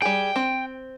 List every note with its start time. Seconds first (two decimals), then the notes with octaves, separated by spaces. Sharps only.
0.02 G3 G#4 G5
0.36 C4